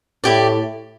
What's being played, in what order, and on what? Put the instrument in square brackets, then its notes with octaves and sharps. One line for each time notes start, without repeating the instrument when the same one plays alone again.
[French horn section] A2 [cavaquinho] E4 G4 D5